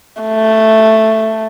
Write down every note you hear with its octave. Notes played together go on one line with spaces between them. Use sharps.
A3